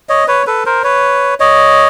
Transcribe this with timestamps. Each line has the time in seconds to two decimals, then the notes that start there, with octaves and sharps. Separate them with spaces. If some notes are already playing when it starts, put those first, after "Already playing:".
0.09 C#5 D#5
0.28 B4 C#5
0.47 A4 B4
0.66 A#4 C5
0.84 B4 C#5
1.40 C#5 D#5